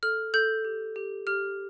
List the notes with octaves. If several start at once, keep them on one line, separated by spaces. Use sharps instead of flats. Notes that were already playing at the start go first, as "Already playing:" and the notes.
A4 F6
A4 G6
G4
G4
G4 F6